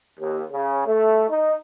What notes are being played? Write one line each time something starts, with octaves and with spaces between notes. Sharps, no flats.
D#2
C#3
A3
D#4